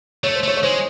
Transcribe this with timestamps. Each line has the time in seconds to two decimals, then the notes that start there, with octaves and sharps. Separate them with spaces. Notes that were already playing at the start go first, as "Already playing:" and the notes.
0.24 A3 C#5
0.36 C5
0.44 A3 C#5
0.57 C#5
0.63 G#3 C5